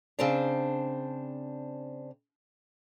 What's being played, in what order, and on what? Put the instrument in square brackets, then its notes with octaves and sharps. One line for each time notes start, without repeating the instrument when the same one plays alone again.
[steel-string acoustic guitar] C#3 C4 D4